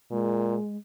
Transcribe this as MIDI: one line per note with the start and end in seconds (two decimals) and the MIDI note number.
0.11 0.55 46
0.11 0.76 56